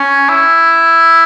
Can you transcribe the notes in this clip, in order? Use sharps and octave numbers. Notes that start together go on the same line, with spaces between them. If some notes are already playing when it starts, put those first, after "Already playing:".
Already playing: C#4
E4